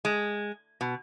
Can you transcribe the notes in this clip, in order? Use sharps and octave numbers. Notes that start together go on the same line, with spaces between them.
G#3
B2